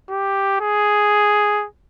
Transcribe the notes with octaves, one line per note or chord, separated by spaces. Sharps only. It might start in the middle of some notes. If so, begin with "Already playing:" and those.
G4
G#4